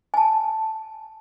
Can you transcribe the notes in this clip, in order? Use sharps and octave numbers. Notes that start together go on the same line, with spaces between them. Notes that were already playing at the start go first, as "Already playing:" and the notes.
G#5 A5